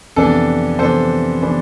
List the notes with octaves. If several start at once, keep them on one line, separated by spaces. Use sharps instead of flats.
F2 C3 E3 B3 D4 A4
F2 C3 E3 B3 D4 A4 C5
C3 E3 B3 D4